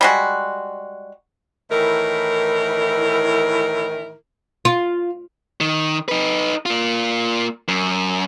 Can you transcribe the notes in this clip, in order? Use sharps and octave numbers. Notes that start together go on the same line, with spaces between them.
G3 G#3 F#4
A2 D#3 E3 E4 A#4
F4
D#3
D#4 B4
A#3 F4
F#2